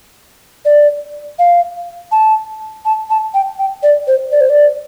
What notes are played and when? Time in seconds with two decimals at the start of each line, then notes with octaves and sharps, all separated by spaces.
0.65 D5
1.39 F5
2.12 A5
2.85 A5
3.10 A5
3.34 G5
3.59 G5
3.83 D5
4.07 C5
4.32 D5
4.41 C5
4.50 D5